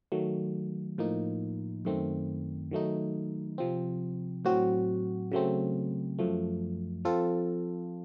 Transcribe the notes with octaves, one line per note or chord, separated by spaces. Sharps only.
D#3 F#3 A3
A2 F3 A#3 D#4
F#2 D#3 A3 C4
D#3 F#3 A3 D#4
C3 F3 C4
A2 F#3 C4 F#4
C#3 F#3 A3 C4
F#2 F3 A3
F3 C4 F4 A4